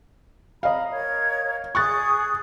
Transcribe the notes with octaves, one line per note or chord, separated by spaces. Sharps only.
D#5 F5 A#5 B5
A#4 C#5 G#6
G#4 C#6 D#6 F#6 A6